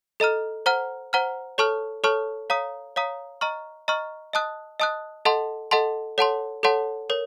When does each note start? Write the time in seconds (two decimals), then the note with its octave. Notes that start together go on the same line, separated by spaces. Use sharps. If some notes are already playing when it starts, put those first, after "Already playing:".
0.20 A4 D#5 A#5 F6
0.66 C5 F#5 A#5 F6
1.13 C5 F#5 A#5 F6
1.58 A4 C#5 A5 C#6 F6
2.04 A4 C#5 A5 C#6 F6
2.50 C#5 F5 A#5 D#6
2.96 C#5 F5 A#5 D#6
3.41 D#5 A#5 C#6 F6
3.88 D#5 A#5 C#6 F6
4.33 D#5 A5 D#6 F#6
4.80 D#5 A5 D#6 F#6
5.25 A4 D#5 F#5 A5 C6
5.71 A4 D#5 F#5 A5 C6
6.18 A4 C#5 F#5 A5 C6
6.63 A4 C#5 F#5 A5 C6
7.10 A#4 C#5